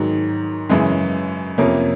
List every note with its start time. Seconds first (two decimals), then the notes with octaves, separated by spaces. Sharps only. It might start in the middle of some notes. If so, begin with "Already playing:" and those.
Already playing: G#2 D#3 F#3
0.69 F#2 C#3 E3 G#3
1.58 F2 C3 F3 A#3 C#4